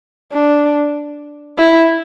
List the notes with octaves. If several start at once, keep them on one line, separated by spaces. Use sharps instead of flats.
D4
E4